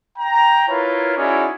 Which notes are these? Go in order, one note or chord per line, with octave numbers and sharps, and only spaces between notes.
G5 A#5
E4 F4 A#4 B4 C#5
C#4 D#4 E4 F#4 G#4 D5